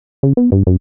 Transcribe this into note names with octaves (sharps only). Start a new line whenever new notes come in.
C#3
B3
G2
F#2